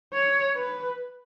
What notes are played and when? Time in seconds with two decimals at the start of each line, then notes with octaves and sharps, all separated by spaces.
0.14 C#5
0.57 B4